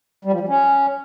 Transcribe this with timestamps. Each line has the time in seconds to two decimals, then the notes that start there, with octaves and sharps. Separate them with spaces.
0.25 G3
0.33 F3
0.40 G3
0.48 C#4